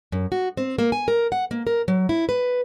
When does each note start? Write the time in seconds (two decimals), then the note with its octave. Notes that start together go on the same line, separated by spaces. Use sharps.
0.12 F#2
0.32 F#4
0.57 C4
0.79 A#3
0.92 G#5
1.08 A#4
1.32 F#5
1.51 A#3
1.67 A#4
1.88 F#3
2.09 E4
2.29 B4